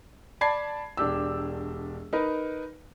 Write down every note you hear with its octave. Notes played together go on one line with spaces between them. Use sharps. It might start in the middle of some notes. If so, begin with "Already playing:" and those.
D5 A5 B5 G#6 C7
E1 D4 G4 E6
D#4 A#4 B4